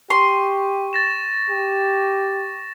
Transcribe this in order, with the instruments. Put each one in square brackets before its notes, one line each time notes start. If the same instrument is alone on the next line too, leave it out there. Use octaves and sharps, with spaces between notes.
[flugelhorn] G4 [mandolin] C6 [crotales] C#6
[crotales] A6 A#6 E7
[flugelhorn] G4